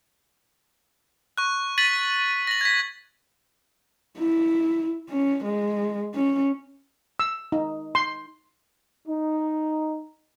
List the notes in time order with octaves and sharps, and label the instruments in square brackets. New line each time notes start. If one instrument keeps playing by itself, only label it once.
[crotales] C#6 F#6
A6 B6 D#7 F#7
A#6 F#7
G#6 B6
[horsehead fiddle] E4
C#4
G#3
C#4
[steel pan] E6
D#4
C6
[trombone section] D#4